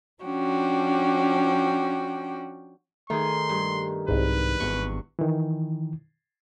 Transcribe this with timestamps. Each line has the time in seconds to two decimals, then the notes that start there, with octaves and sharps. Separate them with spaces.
0.23 F3 C#4 D4 F#4 G5
3.10 D#3 A3 G#4 C6
3.49 G2
4.08 C2 G#2 B4
4.60 G#1 E2 C#6
5.19 D#3 E3